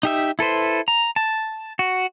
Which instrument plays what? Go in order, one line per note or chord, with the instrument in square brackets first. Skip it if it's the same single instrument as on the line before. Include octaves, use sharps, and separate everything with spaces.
[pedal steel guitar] D#4 G4 E5
E4 A4 B4 C5
A#5
A5
F#4